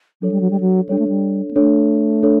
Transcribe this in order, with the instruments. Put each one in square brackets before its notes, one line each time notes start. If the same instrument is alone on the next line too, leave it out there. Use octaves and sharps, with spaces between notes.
[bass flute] F#3 [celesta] D4 A4 C#5
[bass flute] G3
F#3
G3
F#3
[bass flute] G3 [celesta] D4 A4 C#5
[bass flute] A3
G3
B3
[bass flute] A3 [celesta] D4 A4 C#5
[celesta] D4 A4 C#5